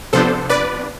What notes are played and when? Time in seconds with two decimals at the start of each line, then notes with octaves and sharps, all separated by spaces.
0.13 C3 F3 B3 D4 A4 C5
0.50 B4 D5